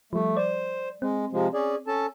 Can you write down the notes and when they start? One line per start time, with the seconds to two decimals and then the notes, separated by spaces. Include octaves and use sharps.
0.13 F3 G3 A3
0.37 C5 D5
1.02 G#3 C4
1.33 C3 F3 G#3
1.54 C#4 G#4 D5
1.87 C#4 A4 A5